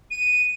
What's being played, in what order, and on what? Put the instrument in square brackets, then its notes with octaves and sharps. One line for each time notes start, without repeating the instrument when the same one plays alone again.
[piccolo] D#7